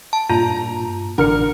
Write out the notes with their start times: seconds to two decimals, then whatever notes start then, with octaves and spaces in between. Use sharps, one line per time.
0.13 A5
0.30 G2 A#2 F4 A#5
1.18 A1 D3 A#4 F6 C#7